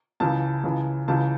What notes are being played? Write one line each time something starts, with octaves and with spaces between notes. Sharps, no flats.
C#2 C#3 E3 A5
C#2 C#3 E3
C#2 C#3 E3 A5